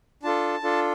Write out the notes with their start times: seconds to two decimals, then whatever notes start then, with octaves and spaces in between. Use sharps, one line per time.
0.23 D4 F4 A4 A5
0.63 D4 F4 A4